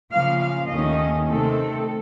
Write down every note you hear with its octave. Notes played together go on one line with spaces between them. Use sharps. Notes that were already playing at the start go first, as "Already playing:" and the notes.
C#3 F3 A#3 F5
F5
D#2 D#3 A3 C#4 D#5
C3 D#3 A3 C4 A4